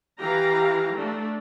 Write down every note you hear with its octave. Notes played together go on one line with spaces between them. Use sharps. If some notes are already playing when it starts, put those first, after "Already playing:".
E3 E4 G4 F5 A#5
A3 D4